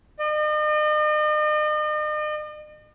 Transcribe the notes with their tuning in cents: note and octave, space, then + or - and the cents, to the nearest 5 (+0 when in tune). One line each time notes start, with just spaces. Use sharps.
D#5 -45